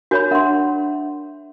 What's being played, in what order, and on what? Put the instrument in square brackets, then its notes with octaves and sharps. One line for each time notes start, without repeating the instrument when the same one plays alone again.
[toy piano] F#4 C#5 B5 [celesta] A#4 G#5 G6
[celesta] D4 E5 F#5 [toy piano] A#4 C6